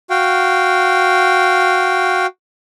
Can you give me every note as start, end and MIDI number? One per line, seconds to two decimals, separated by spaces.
0.10 2.26 66
0.10 2.26 77
0.10 2.26 79